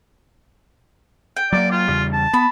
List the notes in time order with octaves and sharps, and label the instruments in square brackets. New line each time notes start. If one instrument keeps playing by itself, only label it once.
[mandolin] G5
[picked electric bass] F#3 G#3 A#3 [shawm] D5
[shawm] F4
[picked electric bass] E2 C#3 G3
[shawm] A5
[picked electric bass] B3 [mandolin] B5